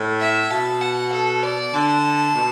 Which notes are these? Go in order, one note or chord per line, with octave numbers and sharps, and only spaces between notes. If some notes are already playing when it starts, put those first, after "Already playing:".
Already playing: A2
E5
B2 A5
F#5
A4
D5
D3 A5
B2